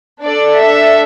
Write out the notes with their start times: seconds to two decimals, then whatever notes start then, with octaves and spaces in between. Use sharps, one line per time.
0.22 D4 A4 D5
0.58 E5